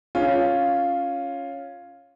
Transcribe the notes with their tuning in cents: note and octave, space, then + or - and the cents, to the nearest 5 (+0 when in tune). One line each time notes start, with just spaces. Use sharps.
C#4 +0 F4 +0 G#4 +0